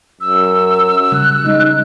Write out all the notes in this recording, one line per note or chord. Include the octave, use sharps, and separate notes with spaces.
F#2 E6
C#3 G3 F#6
G#3 D#4